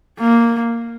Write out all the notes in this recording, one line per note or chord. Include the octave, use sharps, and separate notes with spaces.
A#3